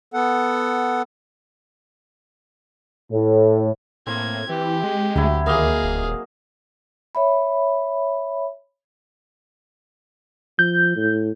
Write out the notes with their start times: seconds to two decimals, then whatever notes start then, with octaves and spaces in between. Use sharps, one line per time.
0.14 B3 A4 F#5
3.11 A2
4.07 A2 A#3 C4 G#6
4.49 E3 G4
4.84 G#3
5.16 D2 F#3 E4
5.46 D#2 A#3 D#4 G#4 D#5 F5
5.83 D#1
7.15 C#5 E5 B5
10.59 F3 G6
10.97 A2